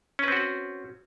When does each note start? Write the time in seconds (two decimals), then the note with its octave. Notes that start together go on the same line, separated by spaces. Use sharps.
0.19 C#4
0.23 B4
0.28 C4
0.32 F#4
0.37 F#5